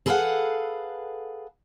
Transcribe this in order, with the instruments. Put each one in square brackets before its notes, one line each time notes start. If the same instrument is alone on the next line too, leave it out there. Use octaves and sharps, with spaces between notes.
[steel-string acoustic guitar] G#4 A4 B4 D5 F5 F#5